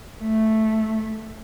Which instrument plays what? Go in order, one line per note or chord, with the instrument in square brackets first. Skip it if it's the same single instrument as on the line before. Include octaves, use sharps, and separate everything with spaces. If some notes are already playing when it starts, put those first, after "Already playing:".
[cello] A3